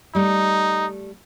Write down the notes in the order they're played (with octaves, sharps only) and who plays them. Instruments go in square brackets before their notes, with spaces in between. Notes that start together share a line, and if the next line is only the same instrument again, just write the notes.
[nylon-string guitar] G3 A3 [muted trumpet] D#4